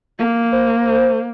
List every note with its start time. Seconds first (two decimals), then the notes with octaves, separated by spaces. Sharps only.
0.19 A#3
0.52 C5